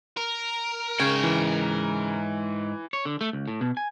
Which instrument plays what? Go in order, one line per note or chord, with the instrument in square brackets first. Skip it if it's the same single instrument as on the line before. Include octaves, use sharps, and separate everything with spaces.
[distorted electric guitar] A#4
[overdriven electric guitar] G#2 G5 [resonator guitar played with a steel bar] C#3
[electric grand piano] E3
[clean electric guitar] C#5
D3
A3
C#2
A2
B2
G#5